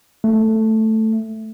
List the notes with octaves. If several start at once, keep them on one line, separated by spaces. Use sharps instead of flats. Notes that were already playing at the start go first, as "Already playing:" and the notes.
A3